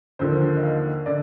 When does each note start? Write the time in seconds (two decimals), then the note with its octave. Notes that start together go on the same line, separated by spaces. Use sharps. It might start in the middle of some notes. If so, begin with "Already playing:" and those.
0.19 D#2 D3 F3 C5
0.57 D#5
0.63 F5
1.06 D3 D5